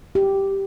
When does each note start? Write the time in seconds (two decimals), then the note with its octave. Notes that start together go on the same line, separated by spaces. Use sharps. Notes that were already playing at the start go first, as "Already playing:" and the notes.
0.15 G4